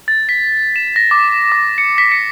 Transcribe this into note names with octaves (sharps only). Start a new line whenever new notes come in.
A6
B6
E7
A#6
D6
D6
C#7
B6
C#7